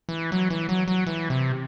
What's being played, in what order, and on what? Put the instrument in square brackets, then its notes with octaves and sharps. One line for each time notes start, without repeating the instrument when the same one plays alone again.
[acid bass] E3
F#3
E3
F#3
F#3
E3
C3